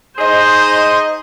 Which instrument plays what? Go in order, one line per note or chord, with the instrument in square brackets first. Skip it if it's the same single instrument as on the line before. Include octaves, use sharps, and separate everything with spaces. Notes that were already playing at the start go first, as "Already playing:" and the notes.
[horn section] D#4 G#4 D#5 [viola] C5